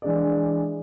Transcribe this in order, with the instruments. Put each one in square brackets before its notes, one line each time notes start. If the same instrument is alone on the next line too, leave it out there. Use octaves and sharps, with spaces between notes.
[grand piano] E3 G#3 D4 G#4 D5